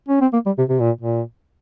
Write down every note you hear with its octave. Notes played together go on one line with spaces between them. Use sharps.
C#4
C4
A#3
G3
C3
C3
A#2
A#2